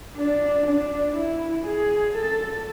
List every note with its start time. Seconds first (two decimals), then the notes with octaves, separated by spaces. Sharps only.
0.17 D4
0.67 D4
1.16 E4
1.66 G#4
2.16 A4